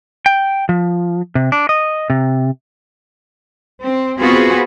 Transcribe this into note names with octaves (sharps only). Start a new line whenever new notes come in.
G5
F3
C3
D4
D#5
C3
C4
B3 C4 F4 F#4 G#4 B4